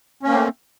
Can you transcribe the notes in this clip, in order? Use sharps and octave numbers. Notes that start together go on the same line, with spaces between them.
A3 A#3 C4 C#4